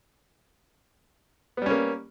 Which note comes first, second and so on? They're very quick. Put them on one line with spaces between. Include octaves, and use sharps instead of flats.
B3 G3 C#4 A#3